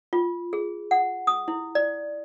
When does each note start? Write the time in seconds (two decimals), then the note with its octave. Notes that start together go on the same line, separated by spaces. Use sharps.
0.13 F4
0.53 G#4
0.91 F#5
1.27 D#6
1.48 E4
1.75 D5